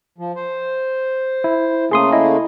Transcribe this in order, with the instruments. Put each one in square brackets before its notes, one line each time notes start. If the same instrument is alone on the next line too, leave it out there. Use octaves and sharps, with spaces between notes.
[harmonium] F3
C5
[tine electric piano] E4
[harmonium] C#3 A3 A#3 [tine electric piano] G#4 C6 D#6
[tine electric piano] E4 D#5